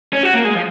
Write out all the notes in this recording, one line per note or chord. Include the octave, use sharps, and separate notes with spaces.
C#4
F#4
A#3
G#3
F3